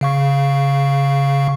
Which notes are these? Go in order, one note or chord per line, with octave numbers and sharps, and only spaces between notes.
C#3 F5 C#6